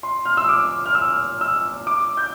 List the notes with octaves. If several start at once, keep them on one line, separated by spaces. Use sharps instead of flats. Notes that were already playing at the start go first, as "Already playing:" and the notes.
C6
F6
E6
D6
F6
E6
E6
D6
G6